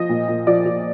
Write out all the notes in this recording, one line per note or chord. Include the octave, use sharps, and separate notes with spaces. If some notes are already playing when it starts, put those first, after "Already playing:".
Already playing: F3 D#5
A#2
A#2
F3 D5
F3